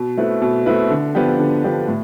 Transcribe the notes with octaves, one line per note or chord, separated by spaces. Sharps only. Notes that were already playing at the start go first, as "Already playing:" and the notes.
Already playing: B2
A3 C4 E4 B4
B2
A3 C4 E4 B4
D3
F3 B3 D4 G4
D3
F3 B3 D4 G4
A2